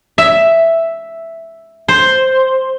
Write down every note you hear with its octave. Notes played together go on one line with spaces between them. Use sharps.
E5
C5